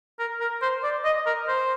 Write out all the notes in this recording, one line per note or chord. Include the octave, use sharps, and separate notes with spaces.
A#4
A#4
C5
D5
D#5
A#4
C5